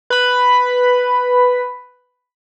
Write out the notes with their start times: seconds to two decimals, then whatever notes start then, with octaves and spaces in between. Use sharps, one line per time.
0.10 B4 B5